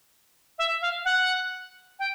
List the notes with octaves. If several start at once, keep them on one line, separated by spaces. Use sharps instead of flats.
E5
F5
F#5
G5